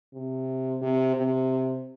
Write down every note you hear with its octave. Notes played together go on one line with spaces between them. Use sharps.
C3
C3
C3